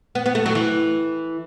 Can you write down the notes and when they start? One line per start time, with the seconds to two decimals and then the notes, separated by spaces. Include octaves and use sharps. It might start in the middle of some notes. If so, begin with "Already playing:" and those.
0.15 B3
0.26 B3
0.35 A3
0.46 F#3
0.55 E3